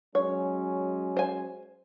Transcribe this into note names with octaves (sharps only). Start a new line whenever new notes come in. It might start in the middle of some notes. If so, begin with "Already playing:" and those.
F#3 G#3 C#4 C#5
C5 G#5